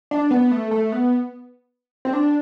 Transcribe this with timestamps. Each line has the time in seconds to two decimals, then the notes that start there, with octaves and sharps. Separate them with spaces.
0.11 D4
0.31 B3
0.51 A3
0.71 A3
0.92 B3
2.05 C4
2.13 D4